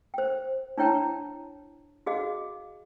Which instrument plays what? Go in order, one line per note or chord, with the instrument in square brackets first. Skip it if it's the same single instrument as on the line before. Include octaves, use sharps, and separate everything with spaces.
[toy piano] C5 G5
D4 E4 C#5 G5 A5 A#5
F#4 G#4 D#5 F5